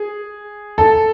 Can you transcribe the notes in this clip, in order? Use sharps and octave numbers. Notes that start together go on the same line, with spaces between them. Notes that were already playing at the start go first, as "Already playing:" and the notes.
Already playing: G#4
A4